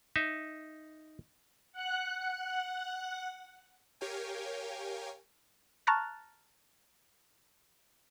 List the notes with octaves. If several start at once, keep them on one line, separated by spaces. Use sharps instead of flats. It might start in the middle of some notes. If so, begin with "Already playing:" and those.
D#4 E5
F#5 F#6
G4 A#4 C#5 F5 G5 G#5
A5 A#5 C#6 F6 F#6 A6